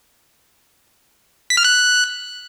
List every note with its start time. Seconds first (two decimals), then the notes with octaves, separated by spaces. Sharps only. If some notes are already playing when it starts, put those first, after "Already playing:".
1.50 B6
1.57 F6
1.64 F#6